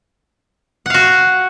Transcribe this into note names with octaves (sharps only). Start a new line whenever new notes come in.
F#4 F5 F#5